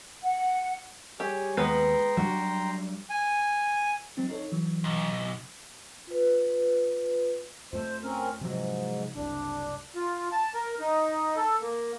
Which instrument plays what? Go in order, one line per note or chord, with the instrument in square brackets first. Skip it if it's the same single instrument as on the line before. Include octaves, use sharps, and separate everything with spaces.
[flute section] F#5
[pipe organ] G3 G#4 C#5 [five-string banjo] G4
[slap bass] D#2 [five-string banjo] G#3 B3 B4 [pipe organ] G5 A#5 C6
[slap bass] F#3 G3 D4 [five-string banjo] F#4
[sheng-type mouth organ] G#5
[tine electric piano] F#3 C4 D#4
D#4 A4 C#5
E3 F#3
[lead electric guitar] B1
[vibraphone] F4 B4
[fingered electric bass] F2 A3 [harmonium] C5
[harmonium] C4 C#4 A#4
[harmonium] G#2 [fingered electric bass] C3 F3 F#3
[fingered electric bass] F#1 C2 [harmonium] D4
[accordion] F4
A5
A#4
D#4
A4
A#3